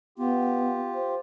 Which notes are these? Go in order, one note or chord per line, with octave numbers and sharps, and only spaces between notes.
B3 F4 G4
C5